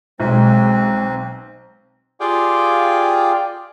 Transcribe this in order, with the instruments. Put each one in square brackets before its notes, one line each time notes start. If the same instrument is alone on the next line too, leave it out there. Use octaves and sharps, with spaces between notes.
[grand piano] B1 [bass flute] G#3 [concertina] C4
[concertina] F4 G4 G#4 D5 F5 G5